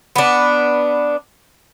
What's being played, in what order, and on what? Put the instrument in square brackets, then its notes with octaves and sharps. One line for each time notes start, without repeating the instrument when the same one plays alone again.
[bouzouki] B3 D4